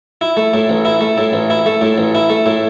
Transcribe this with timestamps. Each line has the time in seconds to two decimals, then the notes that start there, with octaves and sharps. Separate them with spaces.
0.21 E4
0.37 A3
0.54 A2
0.69 A1
0.85 E4
1.01 A3
1.18 A2
1.33 A1
1.50 E4
1.66 A3
1.81 A2
1.98 A1
2.15 E4
2.30 A3
2.46 A2